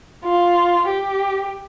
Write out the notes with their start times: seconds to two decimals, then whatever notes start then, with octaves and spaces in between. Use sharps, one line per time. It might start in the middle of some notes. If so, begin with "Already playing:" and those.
0.24 F4
0.88 G4